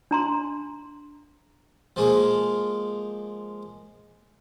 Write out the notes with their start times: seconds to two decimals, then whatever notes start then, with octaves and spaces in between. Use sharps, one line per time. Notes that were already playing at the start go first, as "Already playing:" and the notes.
0.11 D4 A#5 C6
1.96 F3 G#3 A#3